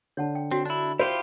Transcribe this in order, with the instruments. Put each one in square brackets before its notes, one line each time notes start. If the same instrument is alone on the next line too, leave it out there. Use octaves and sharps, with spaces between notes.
[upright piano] D3 [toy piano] C#5 F#5 A5
[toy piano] G5
[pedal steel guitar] C4 [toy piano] F#4 C#5
[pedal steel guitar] D4 E4
[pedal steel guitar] E4 F4 G4 [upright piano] C5